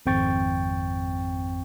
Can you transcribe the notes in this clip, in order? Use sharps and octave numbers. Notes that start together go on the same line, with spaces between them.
G#1 F2 C4 G5 C#6 A6